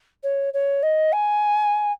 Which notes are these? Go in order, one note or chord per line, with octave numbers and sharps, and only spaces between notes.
C#5
C#5
D#5
G#5